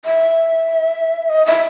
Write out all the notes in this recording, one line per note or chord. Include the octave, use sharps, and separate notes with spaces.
E5
D#5
E5